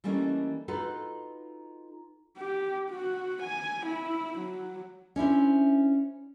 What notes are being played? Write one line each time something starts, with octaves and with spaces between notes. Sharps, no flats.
E3 G3 A3 A#3 C#4 D#4
D#4 F4 F#4 A4 B4
G4
F#4
G#5
E4
F#3
C#4 D4 E4 C5